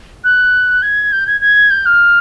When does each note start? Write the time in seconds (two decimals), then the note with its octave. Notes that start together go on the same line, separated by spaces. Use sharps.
0.24 F#6
0.82 G#6
1.12 G6
1.27 G#6
1.41 G#6
1.71 G6
1.86 F6